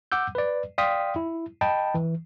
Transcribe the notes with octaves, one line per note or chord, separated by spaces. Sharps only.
F#5 D6 E6 G6
B4 D5
D5 F5 G5 C6 D#6 B6
E4
D#5 G5 A5 B5
E3